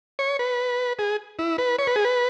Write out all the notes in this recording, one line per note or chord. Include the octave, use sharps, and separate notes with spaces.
C#5
B4
G#4
E4
B4
C#5
B4
G#4
B4